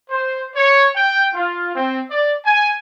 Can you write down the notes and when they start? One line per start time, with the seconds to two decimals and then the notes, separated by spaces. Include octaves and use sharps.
0.10 C5
0.56 C#5
0.96 G5
1.34 F4
1.75 C4
2.11 D5
2.46 G#5